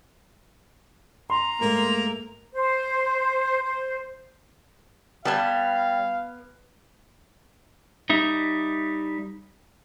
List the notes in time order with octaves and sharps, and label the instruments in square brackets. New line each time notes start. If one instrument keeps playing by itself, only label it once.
[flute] A#5 [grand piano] C6
[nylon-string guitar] G#2 A3 [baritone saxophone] A#3
[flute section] C5
C5
[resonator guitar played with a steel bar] G3 A5 [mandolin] B3 G#5 [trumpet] F5
[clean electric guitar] G3 D#4 E5